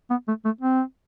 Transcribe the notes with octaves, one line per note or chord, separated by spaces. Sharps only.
B3
A3
A3
C4